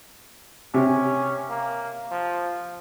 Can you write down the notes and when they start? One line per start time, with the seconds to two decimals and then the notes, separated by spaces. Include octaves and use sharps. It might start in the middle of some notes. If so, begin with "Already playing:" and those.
0.74 C3 C#4
1.49 A#3
2.11 F3